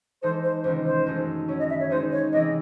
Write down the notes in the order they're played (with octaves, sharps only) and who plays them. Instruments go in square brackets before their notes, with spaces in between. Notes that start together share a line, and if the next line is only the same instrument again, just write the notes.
[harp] E3 G#3 D#4 A4 [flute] C5
[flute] C5
[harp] C#2 C3 D#3 G#3 [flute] C5
[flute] C5
[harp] F#2 D#3 A3 D#4 G#4
[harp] F#3 C#4 E4 [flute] C#5
[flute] D#5
E5
C#5
[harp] D#3 G#3 D#4 G#4 [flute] C5
[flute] C#5
[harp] C3 E3 C4 E4 G#4 [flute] D#5